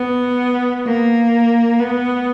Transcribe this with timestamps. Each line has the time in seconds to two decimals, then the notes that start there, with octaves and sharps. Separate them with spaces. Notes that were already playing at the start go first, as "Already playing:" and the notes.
Already playing: B3
0.86 A#3
1.80 B3